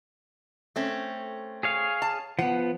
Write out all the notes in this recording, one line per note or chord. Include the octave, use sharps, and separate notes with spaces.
A3 C4 C#4
G#4 C#5 F5
A5
F3 B3 F#5